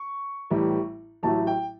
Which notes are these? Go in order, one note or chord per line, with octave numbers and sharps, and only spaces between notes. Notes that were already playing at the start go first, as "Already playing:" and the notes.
Already playing: C#6
A1 A2 E3 G3
A1 A2 F#3 A3 A5
G5